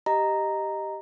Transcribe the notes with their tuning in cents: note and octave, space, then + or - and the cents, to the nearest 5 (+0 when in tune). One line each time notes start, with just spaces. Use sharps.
G4 +0 D#5 +0 A#5 +0